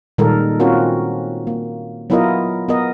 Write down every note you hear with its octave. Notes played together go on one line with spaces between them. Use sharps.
A#2 D#3 G3 G#3 A4 A#4
C4 C#4 F4 F#4 A#4
A#3
F#3 B3 E4 F4 A#4 D#5
B3 A#4 D#5